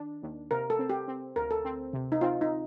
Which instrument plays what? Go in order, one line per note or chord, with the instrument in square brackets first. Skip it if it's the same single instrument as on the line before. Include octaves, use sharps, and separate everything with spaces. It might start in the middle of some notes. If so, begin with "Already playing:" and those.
Already playing: [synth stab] D#3 D4
D#2
[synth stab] C3 [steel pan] A#4
[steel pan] A4
[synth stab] C4
[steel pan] G4
[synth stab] C4
[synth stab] D2 [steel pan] A#4
[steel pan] A4
[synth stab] C4
C3
[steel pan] D#4
[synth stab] C4 [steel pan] F4
[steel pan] D#4